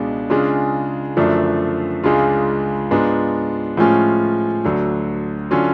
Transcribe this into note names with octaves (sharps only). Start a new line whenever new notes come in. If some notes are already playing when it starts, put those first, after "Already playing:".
Already playing: C#2 B2 G#3 D4
C#3 G#3 D4 F4
F#2 D3 F3 A3 D4
C#2 C#3 G#3 D4 F4
G#2 G#3 B3 D4 F4
A2 F3 G#3 C#4 F4
D2 D3 F#3
D3 F#3 C#4 F4